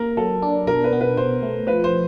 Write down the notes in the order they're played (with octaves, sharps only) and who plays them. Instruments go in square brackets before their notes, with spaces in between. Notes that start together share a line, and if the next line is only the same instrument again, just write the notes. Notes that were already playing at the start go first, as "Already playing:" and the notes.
Already playing: [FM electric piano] A#3 [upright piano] A#4
[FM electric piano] F#3 [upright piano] A4
[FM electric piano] D4
[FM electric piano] B2 [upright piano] A#4
[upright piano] B4
[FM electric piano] B3
[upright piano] B4
[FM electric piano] B2 [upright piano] C5
[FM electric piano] A3
[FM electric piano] F3 [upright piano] B4
[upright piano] C5